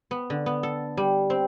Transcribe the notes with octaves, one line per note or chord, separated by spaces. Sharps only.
B3
D3
B3
A4
G3
C4